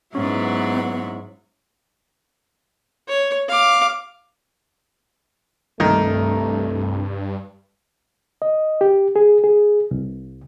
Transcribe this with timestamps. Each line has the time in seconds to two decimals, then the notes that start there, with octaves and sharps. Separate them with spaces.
0.15 G#2 F#3 B3 C#4 E4
3.08 C#5
3.48 F5 D6
5.80 C2 G2 D#3 A3
8.42 D#5
8.81 G4
9.16 G#4
9.44 G#4
9.91 C2